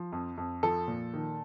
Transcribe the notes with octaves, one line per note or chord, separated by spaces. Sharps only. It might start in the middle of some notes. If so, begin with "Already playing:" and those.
Already playing: F3
F2
F2
F3 A4
A#2
D#3